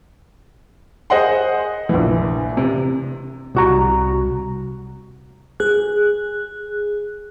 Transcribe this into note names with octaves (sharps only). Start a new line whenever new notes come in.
G#4 C5 D#5 F#5 C6
A#1 E3
C3
C2 F#4 A#5
G#4 F#6